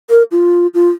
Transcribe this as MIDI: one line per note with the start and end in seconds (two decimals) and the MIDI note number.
0.10 0.23 70
0.32 0.67 65
0.74 0.89 65